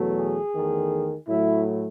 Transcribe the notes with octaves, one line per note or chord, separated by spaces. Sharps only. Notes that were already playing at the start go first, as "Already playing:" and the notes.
Already playing: E2 B2 F#3 A3
G#4
E2 D#3 A3
A2 F#3 A3 E4